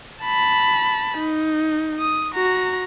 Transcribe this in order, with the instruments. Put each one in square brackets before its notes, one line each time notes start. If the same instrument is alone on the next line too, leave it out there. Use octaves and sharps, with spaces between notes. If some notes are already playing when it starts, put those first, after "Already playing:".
[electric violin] A5 B5
D#4
D#6
F#4 A#5